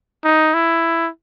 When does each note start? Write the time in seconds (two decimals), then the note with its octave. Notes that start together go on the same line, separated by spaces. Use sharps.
0.24 D#4
0.54 E4